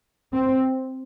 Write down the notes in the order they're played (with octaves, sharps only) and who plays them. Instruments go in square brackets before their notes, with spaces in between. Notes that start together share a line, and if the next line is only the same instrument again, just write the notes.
[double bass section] C4